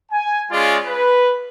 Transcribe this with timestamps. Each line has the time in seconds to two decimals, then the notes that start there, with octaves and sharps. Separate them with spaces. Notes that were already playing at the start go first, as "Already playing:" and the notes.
0.12 G#5
0.51 G#3 C#4 F4 G#4 D5
0.87 B4